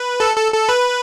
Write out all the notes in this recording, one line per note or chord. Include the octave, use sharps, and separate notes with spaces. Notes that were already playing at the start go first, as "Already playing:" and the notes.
Already playing: B4
A4
A4
A4
B4